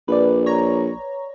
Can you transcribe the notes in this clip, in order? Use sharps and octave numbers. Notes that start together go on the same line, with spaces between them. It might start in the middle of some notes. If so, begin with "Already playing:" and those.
A#1 B4 D5
C#5 A#5